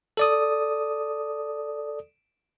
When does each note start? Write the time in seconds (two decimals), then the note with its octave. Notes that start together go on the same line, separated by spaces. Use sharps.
0.17 A4 D5 D#6